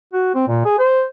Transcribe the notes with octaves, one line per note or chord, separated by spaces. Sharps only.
F#4
C4
A#2
G#4
C5